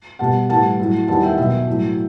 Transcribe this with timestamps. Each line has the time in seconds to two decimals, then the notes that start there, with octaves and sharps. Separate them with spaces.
0.19 B2 G3 F#5 A5
0.49 A2 E3 G3 F#5 A5
0.79 A2 F#3
1.08 E2 D#3 G3 F#5 A5
1.23 E5 G5
1.34 F#5
1.38 B2 F#3 E5 G5
1.67 A2 F#3